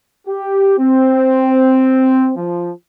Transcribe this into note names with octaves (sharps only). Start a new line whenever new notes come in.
G4
C4
F3